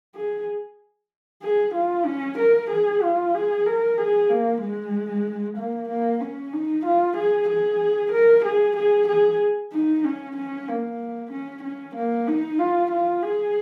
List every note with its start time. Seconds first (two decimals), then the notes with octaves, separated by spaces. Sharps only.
0.15 G#4
1.43 G#4
1.75 F4
2.06 C#4
2.39 A#4
2.71 G#4
3.03 F4
3.35 G#4
3.66 A#4
3.98 G#4
4.29 A#3
4.62 G#3
5.57 A#3
5.89 A#3
6.21 C#4
6.53 D#4
6.86 F4
7.17 G#4
7.49 G#4
8.12 A#4
8.45 G#4
8.77 G#4
9.08 G#4
9.73 D#4
10.05 C#4
10.37 C#4
10.68 A#3
11.32 C#4
11.64 C#4
11.96 A#3
12.28 D#4
12.59 F4
12.92 F4
13.23 G#4